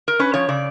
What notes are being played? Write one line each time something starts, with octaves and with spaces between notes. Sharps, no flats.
A#4
C#4 B4
F3 C#5
C#3 D5